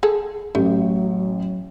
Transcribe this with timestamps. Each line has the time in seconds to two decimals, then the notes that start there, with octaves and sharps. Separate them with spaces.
0.03 G#4 A4
0.55 A1 F#3 A3